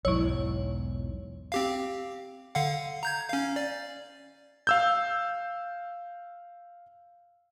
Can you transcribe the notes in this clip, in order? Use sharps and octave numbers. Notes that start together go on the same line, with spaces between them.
B1 E2 G#2 F#3 E4 C#5
C4 G4 F5
D3 F5 F#5
A#5 G6 G#6
C#4 F5
D5
F5 E6 G6